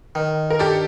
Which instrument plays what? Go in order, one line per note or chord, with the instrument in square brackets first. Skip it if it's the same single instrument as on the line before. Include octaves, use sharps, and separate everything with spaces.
[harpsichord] D#3
[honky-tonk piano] A#4
[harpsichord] D4 [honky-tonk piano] G4 A4